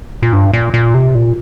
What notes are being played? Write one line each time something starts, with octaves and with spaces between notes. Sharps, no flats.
A#2
G2
A#2
A#2
C3
A#2